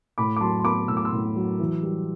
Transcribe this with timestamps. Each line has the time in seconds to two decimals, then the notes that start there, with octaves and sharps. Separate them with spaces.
0.18 A2 B5 D6
0.36 D6
0.41 F#3 A5 C6
0.59 C6
0.65 B3 B5 D6
0.88 A2 E6
0.97 D6
1.05 C6 E6
1.12 A2
1.36 F#3
1.60 E3
1.83 G3